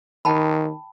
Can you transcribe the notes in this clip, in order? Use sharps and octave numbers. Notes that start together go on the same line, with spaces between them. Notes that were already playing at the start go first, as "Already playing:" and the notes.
D#3 G5 A5 B5